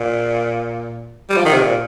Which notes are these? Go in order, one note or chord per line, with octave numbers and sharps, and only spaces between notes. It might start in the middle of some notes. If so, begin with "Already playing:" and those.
Already playing: A#2
G3
F3
D#3
C3
A#2